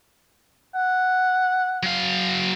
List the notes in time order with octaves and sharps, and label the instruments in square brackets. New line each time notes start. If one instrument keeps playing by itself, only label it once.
[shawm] F#5
[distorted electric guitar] F#3 F5